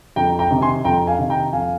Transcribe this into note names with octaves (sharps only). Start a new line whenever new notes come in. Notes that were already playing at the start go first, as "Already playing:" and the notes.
F2 G5 A#5
G5 A#5
C3 D#3
G#5 C6
F2 G5 A#5
F5 G#5
C3 D#3
G5 A#5
F2 F5 G#5